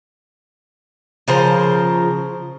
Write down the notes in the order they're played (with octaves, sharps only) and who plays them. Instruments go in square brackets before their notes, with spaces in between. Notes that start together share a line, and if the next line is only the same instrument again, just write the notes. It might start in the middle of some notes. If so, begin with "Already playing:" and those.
[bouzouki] C#3 F3 A#4 C5